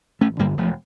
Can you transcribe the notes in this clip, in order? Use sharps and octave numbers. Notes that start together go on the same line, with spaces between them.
A1 A3 C#4
G2 D3 G3 A#3
E1 F3 A3